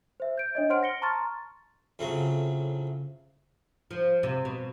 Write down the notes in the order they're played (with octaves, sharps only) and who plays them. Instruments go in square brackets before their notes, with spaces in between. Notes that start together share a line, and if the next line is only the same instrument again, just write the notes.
[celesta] C5 E5
G6 D7
D4 C#5 D#5
C5 F#5 C6 F6 D7
A#6 C#7 G7
A5 A#5 C6 C#6 F6 A6
[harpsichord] F2 A2 C#3 F#3
[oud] F3
C3
B2